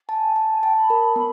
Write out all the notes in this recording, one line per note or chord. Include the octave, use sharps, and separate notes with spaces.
G#5 A5
G#5 A5
G#5
G5 A5
B5
A#4
B3